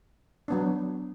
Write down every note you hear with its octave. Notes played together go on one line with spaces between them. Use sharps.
F#3 B3 D4